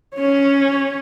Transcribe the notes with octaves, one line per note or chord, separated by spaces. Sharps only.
C#4 C#5